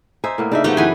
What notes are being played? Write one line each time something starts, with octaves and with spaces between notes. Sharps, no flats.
D#4 C5 E5 G#5
A2 A#3 B3
C#3 D4 D#4 E5
E3 F3 A3 B3 D#4 G4
F#2 E3 G#4 B4 F#5 G#5